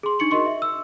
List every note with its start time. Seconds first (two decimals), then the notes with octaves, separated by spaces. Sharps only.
0.03 G#4 C6
0.19 D4 D#4 C#6 C#7 F#7
0.31 F#4 A#4 D#5 C6 C#6
0.46 E5
0.62 E6